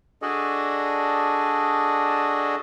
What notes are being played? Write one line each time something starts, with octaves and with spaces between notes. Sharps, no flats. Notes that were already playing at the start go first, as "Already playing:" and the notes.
D4 F#4 G#4 A4 D5 D#5